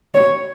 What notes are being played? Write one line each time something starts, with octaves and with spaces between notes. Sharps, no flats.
C#5